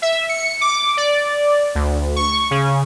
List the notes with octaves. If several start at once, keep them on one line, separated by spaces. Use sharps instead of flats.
E5
C#7
D6
D5
D2
C#6
C#3